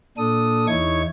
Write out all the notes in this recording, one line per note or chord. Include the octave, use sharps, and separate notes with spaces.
A#2 D4 A4 D#6
E2 D#4 E4 C#5 C#6 G#6